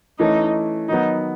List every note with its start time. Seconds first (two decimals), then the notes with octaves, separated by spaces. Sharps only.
0.19 E3 A3 C#4 D#4
0.88 D#3 F#3 B3 D#4